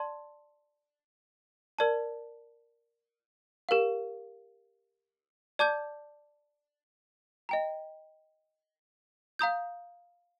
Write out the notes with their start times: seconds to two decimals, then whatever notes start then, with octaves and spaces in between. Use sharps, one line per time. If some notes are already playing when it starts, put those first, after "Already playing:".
Already playing: D5 A5 C6
1.79 A#4 D5 A5
3.69 G4 A#4 F5
5.59 D5 A5 D6 G6
7.49 D#5 G5 A#5
9.39 F5 A#5 D#6 G6